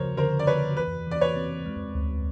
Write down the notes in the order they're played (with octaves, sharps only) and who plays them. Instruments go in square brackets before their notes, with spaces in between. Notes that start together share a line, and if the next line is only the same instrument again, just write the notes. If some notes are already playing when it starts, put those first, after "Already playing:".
Already playing: [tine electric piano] C#3 F3 [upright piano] A#4 C5 C#5
[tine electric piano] D3 [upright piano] A#4 C5
[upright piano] D5
[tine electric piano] D3 [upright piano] B4 C#5
[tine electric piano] E3 [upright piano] B4
[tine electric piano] E3 [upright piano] D5
[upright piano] B4 C#5
[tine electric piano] C4
G#3
D2